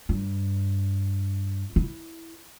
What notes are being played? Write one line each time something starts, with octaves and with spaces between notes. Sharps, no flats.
G2
E4